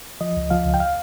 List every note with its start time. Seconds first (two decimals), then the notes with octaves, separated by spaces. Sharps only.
0.21 F3 D#5
0.37 C#2
0.50 F3 F5
0.65 C#2
0.74 G5
0.80 F5